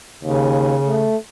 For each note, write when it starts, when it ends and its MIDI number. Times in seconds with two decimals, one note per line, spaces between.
0.24 0.77 39
0.24 1.11 49
0.86 1.16 57